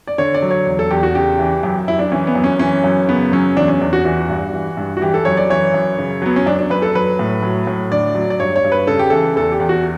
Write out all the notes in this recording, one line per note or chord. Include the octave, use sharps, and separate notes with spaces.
D5
D3 C#5
D5
F#3
C#5
E2
A4
E2 G4
F#4
C#3 G4
E3
F#2 G4
F#2 E4
D4
E3 C#4
B3
F#2
C#4
E3 C#4
F#2
C#3 B3
F#3 C#4
E2 D4
C#4
E2 D4
F#4
E3 F#4
G2
E3
G2
F#4
E3 G4
A4
F#2 C#5
D5
E3 C#5
F#2
C#3
F#3 B3
C#4
F#2 D4
D4
F#2 B4
A4
F#3 B4
A2
F#3
A2
D3 D5
F#3
D5
G2 C#5
C#5
G2
B4
C#3 A4
G4
E3 A4
E2 A4
G4
E2
F#4